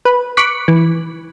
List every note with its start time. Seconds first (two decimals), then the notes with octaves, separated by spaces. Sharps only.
0.05 B4
0.37 C#6 D6 F#6 B6
0.68 E3